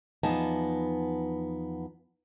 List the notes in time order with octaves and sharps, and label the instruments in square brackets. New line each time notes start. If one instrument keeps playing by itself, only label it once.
[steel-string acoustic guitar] E2 F3 B3 D#4 G#5 A5